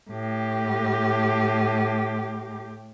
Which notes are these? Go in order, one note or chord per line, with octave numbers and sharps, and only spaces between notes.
A2 G4